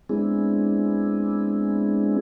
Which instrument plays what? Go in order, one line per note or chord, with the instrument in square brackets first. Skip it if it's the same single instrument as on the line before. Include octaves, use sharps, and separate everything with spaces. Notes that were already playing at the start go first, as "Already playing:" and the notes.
[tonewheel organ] G#3 B3 C4 D4 E4 G#4